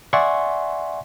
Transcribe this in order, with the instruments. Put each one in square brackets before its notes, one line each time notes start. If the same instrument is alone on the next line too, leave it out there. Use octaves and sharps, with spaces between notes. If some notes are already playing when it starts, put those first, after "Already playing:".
[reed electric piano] D5 E5 F#5 G#5 C6 C#6